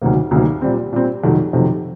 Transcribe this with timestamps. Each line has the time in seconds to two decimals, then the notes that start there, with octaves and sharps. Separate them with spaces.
0.02 D2 C3 D#3 F#3 A#3
0.31 D2 C3 D#3 F#3 A#3
0.62 A#2 G3 C4
0.93 A#2 G3 C4
1.24 F2 C3 D#3 F#3 A3
1.53 F2 C3 D#3 F#3 A3